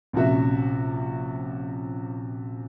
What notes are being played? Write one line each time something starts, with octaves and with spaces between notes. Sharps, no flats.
A#1 C3 C#4 F#4 E5